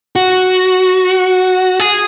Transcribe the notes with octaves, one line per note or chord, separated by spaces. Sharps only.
F#4
G#4